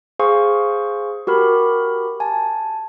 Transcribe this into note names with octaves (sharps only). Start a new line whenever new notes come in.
G#4 C5 F5 G#5 C6 C#6
F#4 G4 A#4 B5
G#5 A5